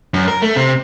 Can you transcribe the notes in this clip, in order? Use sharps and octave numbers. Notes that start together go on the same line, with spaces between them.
F#2
A#4
A3
C3